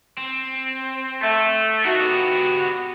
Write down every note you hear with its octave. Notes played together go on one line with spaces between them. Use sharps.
C4
A3
D#3 F#4
B3 G4